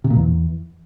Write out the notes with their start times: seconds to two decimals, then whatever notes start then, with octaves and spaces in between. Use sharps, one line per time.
0.04 C3
0.10 A#2
0.16 E2